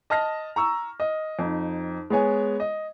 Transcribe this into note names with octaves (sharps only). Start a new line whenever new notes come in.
D#5 A5 F6 A#6
A#5 C#6 E6
D#5
F2 D#4
G#3 B3 C#5 G#5
D#5